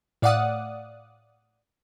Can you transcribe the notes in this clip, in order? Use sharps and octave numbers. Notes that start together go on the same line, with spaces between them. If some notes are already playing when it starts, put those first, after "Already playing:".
A2 D5 F5 F#5 D#6